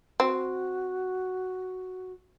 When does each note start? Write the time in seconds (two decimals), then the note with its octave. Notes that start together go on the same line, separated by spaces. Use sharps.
0.20 C4 F#4